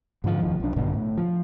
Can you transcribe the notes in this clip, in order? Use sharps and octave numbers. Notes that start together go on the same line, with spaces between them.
G#2 D3 E3 F3
F1 D#2 D#3 F3
B1 D4
A#1 G2 B2 D3
A2
F3